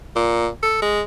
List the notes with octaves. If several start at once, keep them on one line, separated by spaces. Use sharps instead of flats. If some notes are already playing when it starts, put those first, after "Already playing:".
A#2
A4
G#3